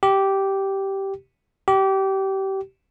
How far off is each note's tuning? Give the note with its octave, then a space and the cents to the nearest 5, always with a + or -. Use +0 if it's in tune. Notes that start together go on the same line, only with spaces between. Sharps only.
G4 -10
G4 -25